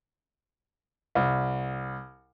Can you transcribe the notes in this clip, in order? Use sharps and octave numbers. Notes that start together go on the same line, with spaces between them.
C2